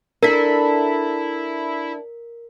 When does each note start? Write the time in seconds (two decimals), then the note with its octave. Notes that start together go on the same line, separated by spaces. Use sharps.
0.23 D4 E4 A4 A#4 B6